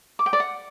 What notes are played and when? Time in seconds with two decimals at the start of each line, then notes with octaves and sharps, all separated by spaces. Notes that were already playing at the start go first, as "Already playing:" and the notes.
0.19 D6
0.26 G5
0.33 D5
0.40 F#5